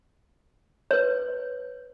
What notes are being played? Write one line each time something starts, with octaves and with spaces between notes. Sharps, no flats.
B4 C#5